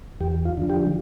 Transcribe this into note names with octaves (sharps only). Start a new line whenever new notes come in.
E2 G4
F4
D3 F3
G4